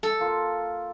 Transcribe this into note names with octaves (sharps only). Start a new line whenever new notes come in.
A4
A#3 F4